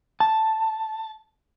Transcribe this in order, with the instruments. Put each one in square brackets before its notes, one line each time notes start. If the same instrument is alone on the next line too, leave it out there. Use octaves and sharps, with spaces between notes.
[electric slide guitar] A5